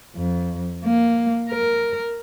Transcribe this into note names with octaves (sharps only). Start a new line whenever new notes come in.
F2
A#3
A#4